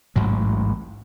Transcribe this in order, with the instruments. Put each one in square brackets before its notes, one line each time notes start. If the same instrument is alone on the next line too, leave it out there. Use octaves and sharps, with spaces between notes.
[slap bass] A1 D2 G#2 F#3